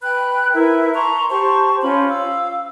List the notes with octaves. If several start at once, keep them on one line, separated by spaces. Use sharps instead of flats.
B4 G5 B5 F#6
E4 A#4 B4 E5
A5 A#5 C6 C#6
G4 C5 A5 C#6
C#4 F4 C5 B5
F5 E6